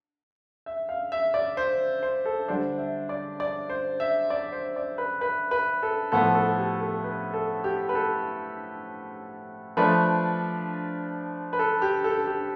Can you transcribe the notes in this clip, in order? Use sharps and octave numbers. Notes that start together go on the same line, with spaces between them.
E5
F5
E5
D5
C5
C5
A4
D3 G3 D4 C5
E5
D5
D5
C5
E5
D5
C5
D5
B4
B4
B4
A4
A2 F3 B3 A4
A4
G4
A4
B4
A4
G4
B4
A4
F3 A3 D4 B4
B4
A4
G4
A4
G4